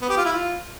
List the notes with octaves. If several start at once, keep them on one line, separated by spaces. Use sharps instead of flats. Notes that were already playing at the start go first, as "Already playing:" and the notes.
B3
G4
F4
E4
F4